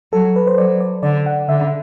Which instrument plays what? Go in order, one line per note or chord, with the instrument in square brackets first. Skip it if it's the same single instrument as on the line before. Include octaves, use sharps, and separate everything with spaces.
[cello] F#3 [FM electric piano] A4
[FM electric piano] B4
C5
[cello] F#3 [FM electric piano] D5
[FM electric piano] D5
[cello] D3 [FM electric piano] D5
[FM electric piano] F#5
[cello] D3 [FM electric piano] E5